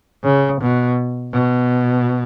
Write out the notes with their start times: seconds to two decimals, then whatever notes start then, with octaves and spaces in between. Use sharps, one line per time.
0.24 C#3
0.62 B2
1.33 B2